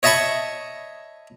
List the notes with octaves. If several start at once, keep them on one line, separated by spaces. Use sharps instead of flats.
C#5 D#5 E5 A5 B5 C#6